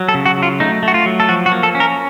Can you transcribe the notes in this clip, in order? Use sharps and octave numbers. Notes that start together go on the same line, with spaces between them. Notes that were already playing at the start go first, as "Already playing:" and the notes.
Already playing: F#3
A4
C#3
F#4
F#3
F4
A3 D#4
A3
F#4
F4
F#3
A4
F3 F#4
F#4
A#3
A4
C#4
A#4